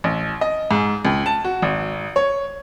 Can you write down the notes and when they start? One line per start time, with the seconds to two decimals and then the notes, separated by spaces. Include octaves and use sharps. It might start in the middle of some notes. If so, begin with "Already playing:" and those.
0.04 A1
0.41 D#5
0.71 G#2
1.05 C#2
1.26 A5
1.45 F#4
1.62 G#1
2.16 C#5